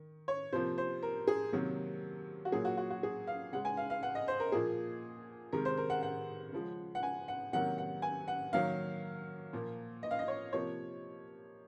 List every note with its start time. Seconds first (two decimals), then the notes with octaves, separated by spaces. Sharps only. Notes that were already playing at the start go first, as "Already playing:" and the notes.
Already playing: D#3
0.28 C#5
0.52 C3 F3 A#3 C5
0.78 C5
1.03 A#4
1.27 G#4
1.52 C3 D#3 F#3 A#3
2.45 F#4
2.52 A#2 F#3 A#3 G#4
2.65 F#4
2.78 F#4
2.90 F#4
3.03 G#4
3.27 F5
3.52 C#3 G#3 F#5
3.65 G#5
3.77 F5
3.90 F5
4.03 F#5
4.15 D#5
4.28 C5
4.40 A#4
4.52 A#2 F3 A#3 G#4
5.53 C3 D#3 G#3 A#4
5.65 C5
5.77 A#4
5.90 F#5
6.03 F#5
6.53 C#3 F3 G#3
6.95 F#5
7.03 G#5
7.28 F#5
7.53 C3 D#3 F#3 A#3 F#5
7.78 F#5
8.02 G#5
8.28 F#5
8.53 D#3 F#3 A#3 F5
9.53 A#2 F3 A#3
10.03 D#5
10.11 F5
10.19 D#5
10.28 C#5
10.53 C3 F3 A#3 C#5